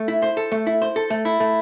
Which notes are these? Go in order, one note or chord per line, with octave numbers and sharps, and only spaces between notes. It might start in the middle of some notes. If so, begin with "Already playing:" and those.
Already playing: A3
E4
C5
A4
A3
E4
C5
A4
A3
E4
A3